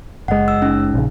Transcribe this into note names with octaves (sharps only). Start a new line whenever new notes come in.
F#1 G#3 D#5 F#5
E6
C#4 D#4
A#1 C#3